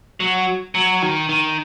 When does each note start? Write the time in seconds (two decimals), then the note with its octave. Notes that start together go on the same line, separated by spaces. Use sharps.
0.20 F#3
0.75 F#3
1.02 D#3
1.29 D#3